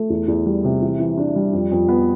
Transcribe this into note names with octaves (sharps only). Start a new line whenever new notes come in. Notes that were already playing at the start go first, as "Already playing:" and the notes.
Already playing: A3
E2
E2
G3
C3
E3
E3
D4
G3
F2
F2
B3